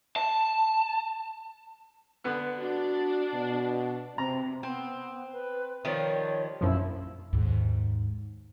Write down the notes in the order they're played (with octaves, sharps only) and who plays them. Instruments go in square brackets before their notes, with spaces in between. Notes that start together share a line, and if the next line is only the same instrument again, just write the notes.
[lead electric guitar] A5
[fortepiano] D3 B3 F#6
[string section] D4 [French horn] F#4
[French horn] B2
[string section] C3 [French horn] C4 [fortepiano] A#5
[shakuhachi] B3 [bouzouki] C4
[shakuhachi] B4
[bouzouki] D#3 F3 G3 [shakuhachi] C#5
[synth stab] A#1 F#2 F3 [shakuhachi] E4
[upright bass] D#2 G#2